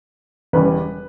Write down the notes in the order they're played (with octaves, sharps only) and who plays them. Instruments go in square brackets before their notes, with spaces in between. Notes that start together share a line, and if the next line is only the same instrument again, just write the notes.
[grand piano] E1 E2 C#3 G3 C#4 B4